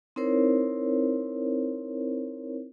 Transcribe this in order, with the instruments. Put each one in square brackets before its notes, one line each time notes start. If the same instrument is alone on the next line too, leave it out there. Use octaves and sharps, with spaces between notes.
[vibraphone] C4 D#4 E4 A#4 C5 C#5